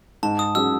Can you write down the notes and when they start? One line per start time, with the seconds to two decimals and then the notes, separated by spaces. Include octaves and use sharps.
0.23 G#2 A5
0.39 D#6
0.55 F#3 C#4 G#4 E6